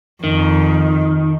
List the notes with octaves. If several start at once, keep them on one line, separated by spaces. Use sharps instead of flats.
F2 D#3